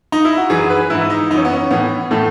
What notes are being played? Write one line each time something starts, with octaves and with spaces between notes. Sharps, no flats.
D#4
E4
F#4
F#2 E3 G#4
B4
G#2 E3 E4
D#4
F#2 E3 C#4 D#4
B3
C#4
A2 E3 B3
A2 E3 A3